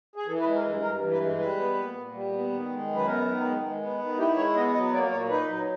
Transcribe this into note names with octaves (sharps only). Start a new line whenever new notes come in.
G#4
E3 A4
B4
G#3
A#4
G2
G2 A#4
E3
B4
G#3
G3 B4
B3
A#2
A#2
G3
B3
D#3
G#3
F#2
B4
B3 A#4
D#3
G#3
G#3
B3
D#3
E4 G4
G#3 C#5
B3 D#5
F#3 D#5
A#3 D5
A#2 C#5
D#4 B4
F#3